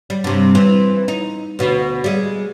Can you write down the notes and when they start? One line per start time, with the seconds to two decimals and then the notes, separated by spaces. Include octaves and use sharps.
0.10 G3
0.24 G2 C3
0.55 E3 C4
1.08 D#4
1.59 D2 B2
2.04 G3 G#3